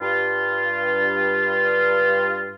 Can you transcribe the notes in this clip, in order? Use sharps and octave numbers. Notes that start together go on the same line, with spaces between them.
G2 F4